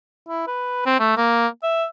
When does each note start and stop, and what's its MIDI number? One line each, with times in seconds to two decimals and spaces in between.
0.29 0.43 64
0.47 0.83 71
0.86 0.95 60
0.99 1.16 57
1.17 1.47 58
1.63 1.86 76